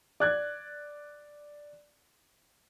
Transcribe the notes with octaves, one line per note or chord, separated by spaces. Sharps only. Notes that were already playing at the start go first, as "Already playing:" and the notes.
D5 F#6 G#6